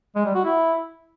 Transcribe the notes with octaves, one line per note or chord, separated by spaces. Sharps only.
G#3
G3
F#4
E4